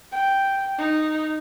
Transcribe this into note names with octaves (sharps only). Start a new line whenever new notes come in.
G5
D#4